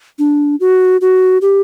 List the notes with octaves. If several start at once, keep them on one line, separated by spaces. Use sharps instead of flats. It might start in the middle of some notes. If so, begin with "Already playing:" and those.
D4
F#4
F#4
G4